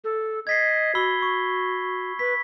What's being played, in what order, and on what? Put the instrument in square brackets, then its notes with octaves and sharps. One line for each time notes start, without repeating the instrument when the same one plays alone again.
[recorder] A4
[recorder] D#5 [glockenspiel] G#6 B6 C7
[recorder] F#4 [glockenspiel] B5 E6 G7
[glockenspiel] C#6
[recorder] B4 [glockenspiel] B6